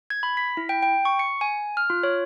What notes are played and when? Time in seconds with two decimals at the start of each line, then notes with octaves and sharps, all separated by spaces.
0.10 G#6
0.23 B5
0.37 B6
0.57 E4
0.69 G5
0.83 G5
1.05 C#6
1.19 C#7
1.41 G#5
1.77 F6
1.90 F4
2.03 C#5